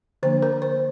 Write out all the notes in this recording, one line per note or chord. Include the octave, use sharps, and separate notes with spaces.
D3 F3 A#3 D4 C5
A#4
C5